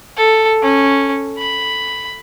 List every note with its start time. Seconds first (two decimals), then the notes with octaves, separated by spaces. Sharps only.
0.17 A4
0.63 C#4
1.38 B5